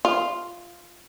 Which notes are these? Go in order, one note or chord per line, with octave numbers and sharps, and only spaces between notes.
F4